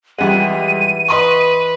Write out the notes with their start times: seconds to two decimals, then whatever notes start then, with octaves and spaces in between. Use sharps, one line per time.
0.18 F2 E3 G3 G#3 F#5 D#7
1.08 B4 D#5 C6 C#6